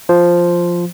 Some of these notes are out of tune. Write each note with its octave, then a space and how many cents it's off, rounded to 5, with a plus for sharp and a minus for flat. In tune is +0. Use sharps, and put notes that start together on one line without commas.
F3 +0 C5 +0